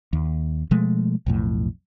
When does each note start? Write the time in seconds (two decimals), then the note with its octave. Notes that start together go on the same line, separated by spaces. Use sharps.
0.13 D#2
0.71 B2 F3 G#3 A3
1.26 B1 F2 A2